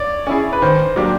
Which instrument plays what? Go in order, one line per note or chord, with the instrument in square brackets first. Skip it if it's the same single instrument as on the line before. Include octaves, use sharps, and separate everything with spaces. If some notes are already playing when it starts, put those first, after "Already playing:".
Already playing: [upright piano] C#5 D5
[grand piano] C#4 E4 G#4
[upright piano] B4
[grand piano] D#3 [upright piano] C5
[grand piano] F#3 A#3 D4 G4